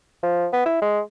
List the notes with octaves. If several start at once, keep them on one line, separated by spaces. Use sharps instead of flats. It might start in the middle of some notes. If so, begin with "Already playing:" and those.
F3
B3
E4
G#3